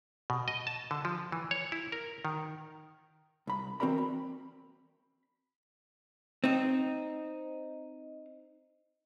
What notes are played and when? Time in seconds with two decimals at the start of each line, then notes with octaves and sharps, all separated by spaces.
0.30 B2
0.48 D#5
0.67 A5
0.91 D3
1.05 F3
1.32 E3
1.51 C#5
1.72 E4
1.92 A#4
2.25 D#3
3.47 C2 B5
3.80 E3 C4 F#4 A#4 D5 B5
3.98 B5
6.44 C4 D#4